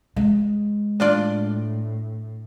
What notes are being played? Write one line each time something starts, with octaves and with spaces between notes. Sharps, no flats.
G#3
A2 D4 F4 D5